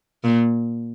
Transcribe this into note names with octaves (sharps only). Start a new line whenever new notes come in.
A#2